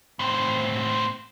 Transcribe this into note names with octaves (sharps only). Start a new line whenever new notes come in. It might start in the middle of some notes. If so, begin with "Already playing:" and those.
A2 C4